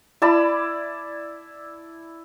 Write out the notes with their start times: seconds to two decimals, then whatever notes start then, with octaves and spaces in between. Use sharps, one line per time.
0.22 E4 D5 A5 B5